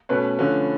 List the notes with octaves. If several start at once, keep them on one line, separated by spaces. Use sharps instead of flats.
B2 A3 C#4 B4
D3 F3 A3 C#4